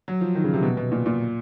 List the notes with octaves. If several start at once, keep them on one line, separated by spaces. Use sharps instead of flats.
F#3
F3
D#3
C#3
C3
B2
B2
A#2
A#2